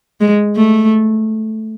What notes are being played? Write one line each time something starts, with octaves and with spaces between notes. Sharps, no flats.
G#3
A3